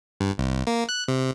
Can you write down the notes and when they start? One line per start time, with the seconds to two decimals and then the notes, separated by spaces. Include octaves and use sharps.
0.20 G2
0.38 C2
0.67 A#3
0.89 F#6
1.08 C3